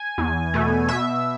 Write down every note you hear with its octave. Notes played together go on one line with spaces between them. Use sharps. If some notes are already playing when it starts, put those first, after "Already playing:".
Already playing: G#5
E2
B2 A3
B2 E5